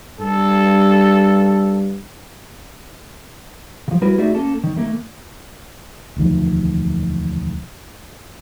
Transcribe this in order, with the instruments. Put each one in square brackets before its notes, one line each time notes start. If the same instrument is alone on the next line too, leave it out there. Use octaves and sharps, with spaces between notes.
[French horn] G2 [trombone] A4
[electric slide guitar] C#3 F3
G3 E4 F#4 A#4 B4
A3 D#4 F#4 G#4 D5 E5
A#3 C#4 A4 A5
D#3
D#3 A3 A#3
[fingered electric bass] E1 D2 D#3 F3